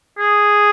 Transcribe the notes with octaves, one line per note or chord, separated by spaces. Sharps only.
G#4